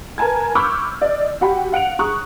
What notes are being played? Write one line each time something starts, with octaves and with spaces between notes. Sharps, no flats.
A#4 B4 G#5 A5 G#6
B5 C#6 D6 E6 F6 G6
D5 D#5
F#4 G4 F#5 G5 B5
F5 F#5 D7 F7
G#4 A#5 C#6 D#6 F#6